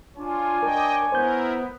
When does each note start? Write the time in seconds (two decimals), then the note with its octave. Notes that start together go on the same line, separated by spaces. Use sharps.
0.17 D4 F4 C#5 G#5
0.63 A#4 D#5 G5
1.12 B3 E4 A#4 C5 G6